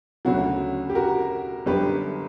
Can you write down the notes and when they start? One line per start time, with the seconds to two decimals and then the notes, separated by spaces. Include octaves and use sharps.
0.25 D2 C#3 F#3 F#4
0.89 G4
0.95 F#4 A#4
1.66 G1 F#2 D3 G4 B4